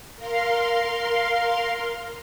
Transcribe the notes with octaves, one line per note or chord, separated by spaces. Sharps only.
A#4 F5 C6